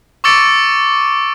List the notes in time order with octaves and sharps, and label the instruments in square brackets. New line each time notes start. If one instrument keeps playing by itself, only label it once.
[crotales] C#6 D6 E6 A6 C#7 D7